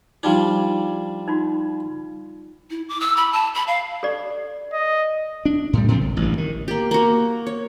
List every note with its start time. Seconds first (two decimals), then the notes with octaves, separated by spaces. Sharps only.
0.23 F3 G3 D4 D#4
1.28 D#4 F4 F#4
2.70 E4
2.88 D6
3.00 E6
3.17 B5
3.33 A5
3.54 B5
3.67 F5
4.03 A4 D5
4.73 D#5
5.45 D4
5.73 A2 G3
5.88 A2 C#3 F3 C4
6.02 A#1
6.17 A1 G2
6.38 D#3
6.68 A#3 G4
6.91 A#3 F#4
7.47 C#5